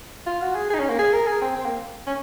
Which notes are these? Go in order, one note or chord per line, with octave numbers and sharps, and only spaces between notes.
F4
F#4
G#4
G#4
D#4
C#4
A#3
G#4
A#4
G#4
C4
C4
A#3
C#4